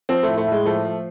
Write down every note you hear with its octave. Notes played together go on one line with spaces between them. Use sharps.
F3 C4
A2 A3
A3
A2
G#3
F3 A3
F3